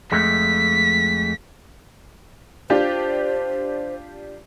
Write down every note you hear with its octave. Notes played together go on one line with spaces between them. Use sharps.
F2 G#3 A3 B6
D4 F4 G4 C5